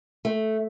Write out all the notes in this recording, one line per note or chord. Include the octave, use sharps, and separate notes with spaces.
A3